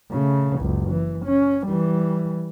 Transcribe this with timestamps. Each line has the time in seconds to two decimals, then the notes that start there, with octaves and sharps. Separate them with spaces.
0.11 C#3 A3
0.59 F#1 C#2
0.90 E3
1.25 C#4
1.66 E3 G3